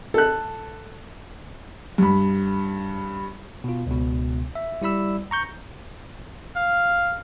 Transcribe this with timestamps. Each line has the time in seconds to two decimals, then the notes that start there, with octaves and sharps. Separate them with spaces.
0.14 A4 F#6
1.98 G2 B5
3.64 B2 F4
3.87 C#2 B2
4.56 E5
4.82 G3 E4 D5 B5 E6
5.31 A#5 C#6 G6
6.56 F5